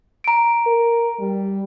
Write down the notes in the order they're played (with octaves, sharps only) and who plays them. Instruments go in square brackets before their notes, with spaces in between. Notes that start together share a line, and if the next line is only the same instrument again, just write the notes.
[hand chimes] A#5 D7
[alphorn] A#4
G3